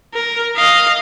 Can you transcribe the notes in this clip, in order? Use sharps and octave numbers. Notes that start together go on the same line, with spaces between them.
A#4
D#5 F5